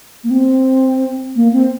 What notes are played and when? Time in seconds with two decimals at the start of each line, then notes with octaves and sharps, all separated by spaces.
0.24 A#3
0.30 C4
1.36 A#3
1.53 C4